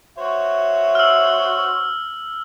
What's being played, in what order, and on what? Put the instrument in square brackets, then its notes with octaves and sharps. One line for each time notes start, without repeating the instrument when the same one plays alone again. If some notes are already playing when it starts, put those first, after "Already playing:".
[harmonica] F#4 C5 C#5 [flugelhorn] E5
[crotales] E6 F6